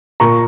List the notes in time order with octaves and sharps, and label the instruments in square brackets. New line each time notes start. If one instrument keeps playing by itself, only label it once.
[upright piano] A#2 A#5 C#6